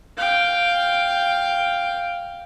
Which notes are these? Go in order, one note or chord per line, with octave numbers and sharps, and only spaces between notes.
F5 G5